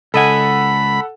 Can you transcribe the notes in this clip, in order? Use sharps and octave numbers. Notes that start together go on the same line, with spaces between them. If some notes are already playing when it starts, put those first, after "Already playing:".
C#2 A4 D#5 F#5 G#5 B5